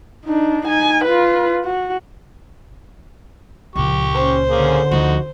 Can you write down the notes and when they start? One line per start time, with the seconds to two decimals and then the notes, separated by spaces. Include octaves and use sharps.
0.25 D4 D#4
0.66 D#4 G#5
1.05 F4 B4
1.64 F#4
3.76 C#2 A#2 F3 G4 C#6
4.15 C#4 C5
4.49 D3 A#3 C#4 G#4
4.92 D2 F3 D#4 F#4